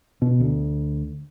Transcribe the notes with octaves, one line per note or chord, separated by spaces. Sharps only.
B2
D2